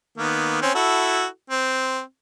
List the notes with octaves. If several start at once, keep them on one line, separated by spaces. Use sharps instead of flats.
D#3 A#3 B3
C4 C#4
E4 F#4 A4
C4